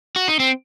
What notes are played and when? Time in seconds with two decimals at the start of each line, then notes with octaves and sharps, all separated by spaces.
0.16 F#4
0.28 D#4
0.39 C4